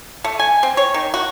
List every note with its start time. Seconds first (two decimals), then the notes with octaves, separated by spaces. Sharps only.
0.24 A3
0.39 G#5
0.63 C4
0.77 C#5
0.94 D#3
1.14 F#4